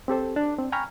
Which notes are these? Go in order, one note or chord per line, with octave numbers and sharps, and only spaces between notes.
C4 G4 A4 C5
D4
C4
G5 G#5 A#5 B5 C#6 F6